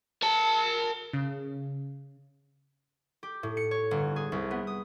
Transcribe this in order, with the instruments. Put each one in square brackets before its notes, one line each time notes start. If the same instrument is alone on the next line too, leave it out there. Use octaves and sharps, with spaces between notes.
[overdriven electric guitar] A#4 A5
[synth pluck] C#3
[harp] G4
A2
C#7
C#5
G1
G#4
C2
B3
D#6